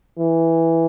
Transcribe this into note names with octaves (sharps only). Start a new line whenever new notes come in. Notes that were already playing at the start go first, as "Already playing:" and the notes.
E3